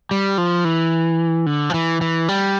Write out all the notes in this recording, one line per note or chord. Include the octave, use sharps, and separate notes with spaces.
G3
F3
E3
D3
F3
E3
E3
G3